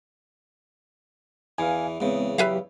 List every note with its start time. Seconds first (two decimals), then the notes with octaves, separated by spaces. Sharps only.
1.58 E2 E3 F5 G#5
2.00 E2 C#3 G#3 B3 C4
2.38 F#3 G4 B4 E5 F5